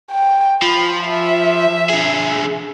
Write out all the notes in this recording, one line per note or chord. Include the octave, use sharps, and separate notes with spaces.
G5
F3 B5
E5
D3 G#4